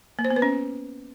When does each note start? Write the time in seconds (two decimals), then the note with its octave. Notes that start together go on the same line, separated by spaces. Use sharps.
0.19 A#3
0.25 C5
0.30 B3
0.36 B4
0.42 C#4